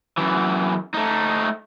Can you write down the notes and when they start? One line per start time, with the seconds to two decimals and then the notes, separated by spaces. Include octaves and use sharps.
0.18 F#2 E3
0.94 A3 D#4